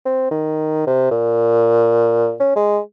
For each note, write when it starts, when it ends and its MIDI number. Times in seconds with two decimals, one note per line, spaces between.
0.06 0.31 60
0.31 0.84 51
0.87 1.07 48
1.11 2.34 46
2.40 2.51 61
2.56 2.79 56